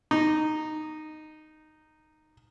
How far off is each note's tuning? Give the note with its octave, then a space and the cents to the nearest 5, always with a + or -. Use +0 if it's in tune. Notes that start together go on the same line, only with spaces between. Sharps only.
D#4 -10